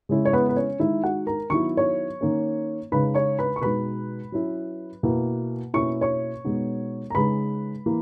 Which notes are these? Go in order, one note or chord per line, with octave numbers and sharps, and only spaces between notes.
C#3 G#3 C#4 E4
C#5
B3 B4
B4
C#4 C#5
D#3 G#3 D#4 E4 E5
F#4 F#5
A#4 A#5
D#3 F#3 B3 E4 C#6
C#5 C#6
D#3 A#3 C#4
C#3 G#3 D#4 B4 B5
C#5 C#6
B4 B5
C#6
B2 G#3 D#4 B4 B5
F#3 C#4 E4
B2 A#3 E4
B2 A#3 C#4 E4 C#6
C#5 C#6
B2 G#3 B3 D#4
A#5
C#3 G#3 D#4 B4 B5
E3 A#3